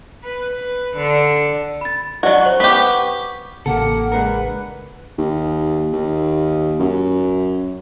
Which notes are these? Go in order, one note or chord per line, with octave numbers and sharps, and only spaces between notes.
B4
D3
B5 A6
F#3 F#4 D5 D#5
C5 C#6
B3 G4 C#6 B6
A1 C#3 A#3 C4 G4 A4 F#5
G#3 D4 A#4 B4
D#2
D#2
F#2